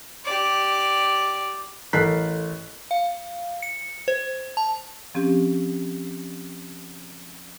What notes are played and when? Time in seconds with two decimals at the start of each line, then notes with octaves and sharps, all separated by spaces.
0.25 G4 D5
1.93 A1 A4 A#4 F#6 B6 C7
2.91 F5
3.62 C#7
4.08 C5
4.57 A5
5.15 F3 C4 C#4 G4